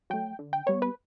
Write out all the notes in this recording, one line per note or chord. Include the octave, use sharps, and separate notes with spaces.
F#3 A3 G5
D3
G5
G3 B3 C#5
B4